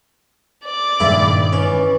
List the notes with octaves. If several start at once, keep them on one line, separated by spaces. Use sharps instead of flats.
D5
G2 A#2 D#3 E4 G#4
E3 C#4